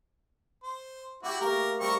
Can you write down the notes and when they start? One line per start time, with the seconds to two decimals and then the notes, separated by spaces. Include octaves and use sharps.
0.63 C5
1.23 E4 F#4 G4 D6
1.41 A3 A#3 A#4
1.80 G3 C4 A#4 C#6